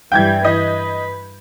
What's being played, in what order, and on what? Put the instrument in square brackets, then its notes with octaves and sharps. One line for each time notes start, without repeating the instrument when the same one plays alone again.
[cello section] G2 E3 G3 [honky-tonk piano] G5 G6 G#6
[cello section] B4 [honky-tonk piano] D#5